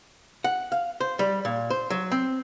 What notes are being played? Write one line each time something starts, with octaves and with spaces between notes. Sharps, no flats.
F#5
F5
C5
G3
A#2
C5
F#3
C4